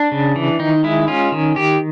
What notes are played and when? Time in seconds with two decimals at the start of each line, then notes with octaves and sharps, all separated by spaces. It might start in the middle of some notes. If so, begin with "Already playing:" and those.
Already playing: D4
0.12 C#3
0.36 E3
0.59 D#3 D#4
0.84 G#3 E4
1.08 C#4 F4
1.32 D#3
1.56 D#3 G4